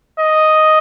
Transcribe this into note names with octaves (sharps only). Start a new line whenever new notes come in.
D#5